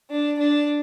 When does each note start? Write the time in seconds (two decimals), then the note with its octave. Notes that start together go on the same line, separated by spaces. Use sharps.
0.10 D4
0.39 D4